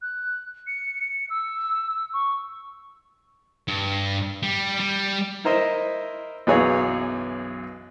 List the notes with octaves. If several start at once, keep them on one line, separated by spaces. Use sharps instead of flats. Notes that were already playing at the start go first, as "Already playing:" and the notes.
F#6
C#7
E6
C#6
G2
G3
G3
E4 A#4 C5 D#5 E5
B1 F#2 E3 G#4 C#5 F5